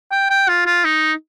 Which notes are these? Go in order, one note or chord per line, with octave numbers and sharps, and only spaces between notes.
G5
G5
F4
F4
D#4